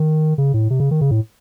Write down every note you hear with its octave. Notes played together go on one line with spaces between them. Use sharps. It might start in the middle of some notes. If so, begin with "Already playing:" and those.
Already playing: D#3
C#3
A2
C3
C#3
D#3
C#3
A2